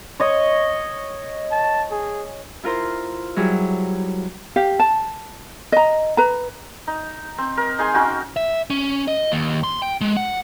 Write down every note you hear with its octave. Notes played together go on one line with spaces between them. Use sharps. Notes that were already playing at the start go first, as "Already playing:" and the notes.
C#5 D#5
A5
G#4
E4 F4 A#4 C5
F#3 G3 E4 G#4
G4 F5
A5
D#5 A#5
B4 A#5
D#4
C4
A#4
D#4 G#4 G#5 C6
C#4 D#4 F#4 G5
E5
C#4
D#5
D#2
C6
G5
G#3
F#5